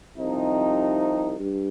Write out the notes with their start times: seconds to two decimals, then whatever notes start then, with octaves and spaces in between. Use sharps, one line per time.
0.16 C2 C3 F3 C4 D#4
1.39 G2